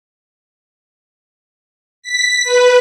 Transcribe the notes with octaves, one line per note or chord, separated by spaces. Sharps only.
B6
B4